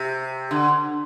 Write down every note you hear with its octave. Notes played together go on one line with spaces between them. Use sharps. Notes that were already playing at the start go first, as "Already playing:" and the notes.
Already playing: C3
D3